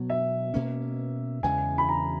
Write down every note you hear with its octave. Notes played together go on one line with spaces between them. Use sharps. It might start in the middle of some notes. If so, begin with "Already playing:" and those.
Already playing: B2 F#3 B3
E5
B2 A#3 C#4
E2 C#3 E3 G#3 G#5
B5
A#5